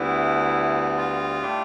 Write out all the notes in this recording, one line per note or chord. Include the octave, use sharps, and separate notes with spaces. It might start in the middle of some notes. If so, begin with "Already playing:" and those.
Already playing: D2 D3 G3 B3 E4
F4
A2 G3 D4